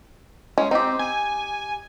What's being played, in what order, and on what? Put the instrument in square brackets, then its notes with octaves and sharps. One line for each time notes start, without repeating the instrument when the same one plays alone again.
[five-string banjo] G#3 [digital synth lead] C#4
[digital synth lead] C4 [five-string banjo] D#4 G4
[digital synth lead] G#5